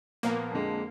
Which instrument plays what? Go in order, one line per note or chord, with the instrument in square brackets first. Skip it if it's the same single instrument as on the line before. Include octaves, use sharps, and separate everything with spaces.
[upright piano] A#2 F3 B3 [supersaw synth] A#3
[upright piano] F2 D3 G#3